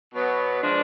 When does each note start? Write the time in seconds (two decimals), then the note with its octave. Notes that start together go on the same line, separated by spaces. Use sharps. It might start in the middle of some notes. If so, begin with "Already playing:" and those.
0.14 B2 F#3 B3
0.62 F3 G#3 D4